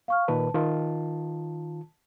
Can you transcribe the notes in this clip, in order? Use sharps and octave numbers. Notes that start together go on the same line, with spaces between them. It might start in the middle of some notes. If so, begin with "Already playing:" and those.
F5 C#6 F6
A#2 D#3 B4 A5
D#3 F4